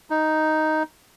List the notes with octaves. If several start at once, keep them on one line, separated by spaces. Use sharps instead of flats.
D#4